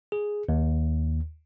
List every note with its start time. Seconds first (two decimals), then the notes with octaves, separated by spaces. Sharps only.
0.12 G#4
0.49 D#2